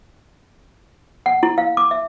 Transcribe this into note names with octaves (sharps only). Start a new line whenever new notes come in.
F#5
E4
F5
D6
E5